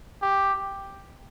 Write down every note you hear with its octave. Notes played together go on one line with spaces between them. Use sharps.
G4